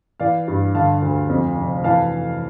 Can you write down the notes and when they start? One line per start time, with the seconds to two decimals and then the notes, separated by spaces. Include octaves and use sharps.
0.20 E3 D5 F5
0.48 G2
0.75 D3 F5 A5
1.02 D2
1.29 F2
1.57 F1
1.84 E3 F5 A5